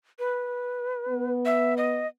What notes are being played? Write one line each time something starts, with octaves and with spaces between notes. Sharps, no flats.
B4
B3
E5
D#5